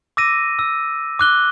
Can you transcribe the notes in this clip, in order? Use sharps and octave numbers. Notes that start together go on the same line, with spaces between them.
D6 E6 A#6 D#7
E6
D6 F#6 G7